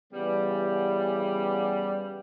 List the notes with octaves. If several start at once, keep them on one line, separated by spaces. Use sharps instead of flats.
C#3 E3 G3 B3